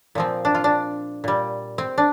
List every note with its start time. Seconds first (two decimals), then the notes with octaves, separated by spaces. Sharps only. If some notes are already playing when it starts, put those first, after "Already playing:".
0.15 A#2 F3 C4
0.45 D4
0.55 F4
0.64 D4
1.24 A#2 G3
1.78 C4
1.98 D4